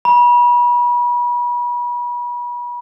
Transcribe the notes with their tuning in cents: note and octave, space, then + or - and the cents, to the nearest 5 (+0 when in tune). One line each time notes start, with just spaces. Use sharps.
B5 -35